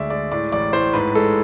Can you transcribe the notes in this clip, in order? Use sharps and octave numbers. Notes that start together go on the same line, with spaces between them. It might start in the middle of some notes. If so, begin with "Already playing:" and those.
Already playing: D2 G#3 D5 E5
G#3 D5
A2 D5
A1 D5
A2 C5
G#2 B4
G#3 A4